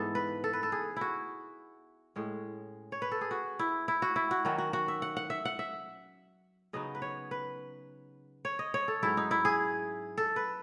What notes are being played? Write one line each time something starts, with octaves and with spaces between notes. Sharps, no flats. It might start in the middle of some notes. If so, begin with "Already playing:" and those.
Already playing: G#2 E3 B3 A4
B4
A4
B4
A4
G#4
E4 F#4
A2 G#3 C#4
C#5
B4
A4
G#4
F#4
E4
E4
F#4
E4
F#4
D#3 F#3 C#4 F#4
F#4
F#4
E5
F#5
F#5
E5
F#5
E5
C#3 F#3 B3 D#4 D#5
B4
C#5
B4
C#5
D#5
C#5
A4
G#2 F#3 C#4 E4
D#4
E4
G#4
A4
B4